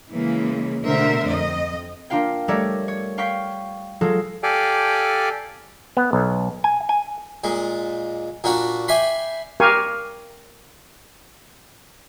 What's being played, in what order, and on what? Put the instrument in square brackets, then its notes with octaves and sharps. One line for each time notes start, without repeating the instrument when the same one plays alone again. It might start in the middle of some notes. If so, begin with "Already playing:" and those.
[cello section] C#3 E3 G#3 A#3
B2 D3 A3 A#4 C5 E5
F2 D#5
[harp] A#3 D4 F4 F5 G5
G3 A3 A#4 C#5 D5 E5
C#5
F5 G5 C#6 G6 B6
F#3 G#3 F4 A4
[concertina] G4 A4 D5 F5 G5 G#5
[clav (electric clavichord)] B3
B1
G#5
G#5
[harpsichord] A#2 G#3
A#2 A#3 D4 F#4
D5 E5 G5 G#5 B5 C6
[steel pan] G4 A#4 F5 G#5 C#6